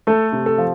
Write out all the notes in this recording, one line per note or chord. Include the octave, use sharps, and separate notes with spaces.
A3 A4
C3
A4
F3